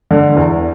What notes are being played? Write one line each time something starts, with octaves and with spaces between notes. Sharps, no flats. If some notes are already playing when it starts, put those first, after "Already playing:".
D3
E2